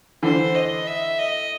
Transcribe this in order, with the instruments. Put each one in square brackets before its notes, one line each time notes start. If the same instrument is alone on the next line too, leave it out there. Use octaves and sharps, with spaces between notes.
[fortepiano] D3 E3 [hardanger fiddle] C5
[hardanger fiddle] D#5
E5
D#5